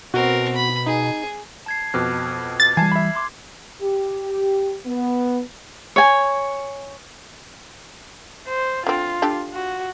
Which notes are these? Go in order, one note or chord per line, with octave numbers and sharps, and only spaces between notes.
B2 C4 F#4 A#4
B5
D#4 G#4
A5 G#6 C7
F2 B2 D6 F6 F#6
A6
E3 G3 G#5 A5 G#6 C7
E5 B5
C6 D6
G4
B3
C#5 G#5
C5
D3 C4 F4
D4 G4 A4
F#4